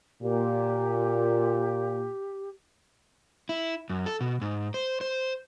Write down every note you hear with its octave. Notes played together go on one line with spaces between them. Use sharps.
A#2 G4
E4
F#2
A4
B2
G#2
C5
C5